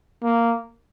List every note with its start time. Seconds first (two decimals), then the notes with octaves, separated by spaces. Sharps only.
0.24 A#3